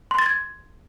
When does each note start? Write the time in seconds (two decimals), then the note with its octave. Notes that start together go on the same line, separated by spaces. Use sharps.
0.11 C6
0.19 A6
0.26 G#6